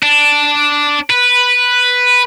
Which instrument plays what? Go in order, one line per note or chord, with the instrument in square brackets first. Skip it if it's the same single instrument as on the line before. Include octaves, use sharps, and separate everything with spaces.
[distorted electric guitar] D4
B4